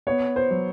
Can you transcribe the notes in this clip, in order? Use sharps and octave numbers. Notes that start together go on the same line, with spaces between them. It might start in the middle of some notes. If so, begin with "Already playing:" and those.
B3 C#5
C5
F#3